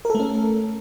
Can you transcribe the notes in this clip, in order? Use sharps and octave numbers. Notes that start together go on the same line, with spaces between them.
A3 C#4 A4 A#4